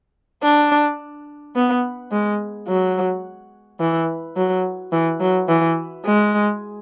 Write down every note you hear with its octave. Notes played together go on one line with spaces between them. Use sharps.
D4
B3
G#3
F#3
E3
F#3
E3
F#3
E3
G#3